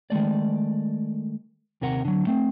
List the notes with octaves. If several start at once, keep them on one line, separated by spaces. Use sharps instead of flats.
D#3 G#3 A3 D5
D#2 C3 A#4 F#5
D3 F#3
A3 C4